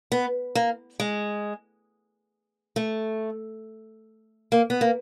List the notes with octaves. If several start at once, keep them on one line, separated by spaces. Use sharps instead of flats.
B3
A#3
G#3
A3
A#3
B3
A#3